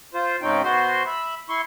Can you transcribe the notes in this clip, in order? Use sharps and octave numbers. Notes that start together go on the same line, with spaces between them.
F4 C5
G#2 C#3 C4 C#4 D#4 G5
B2 B3 F#4 C5 C6
E5 B5
E4 C6 C#6